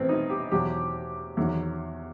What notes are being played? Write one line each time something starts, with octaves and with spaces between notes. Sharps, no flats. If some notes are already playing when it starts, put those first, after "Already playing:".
Already playing: A1 A2 E3 B3 C4
D#4
G4
E2 B2 F#3 G4
E2 D#3 F#3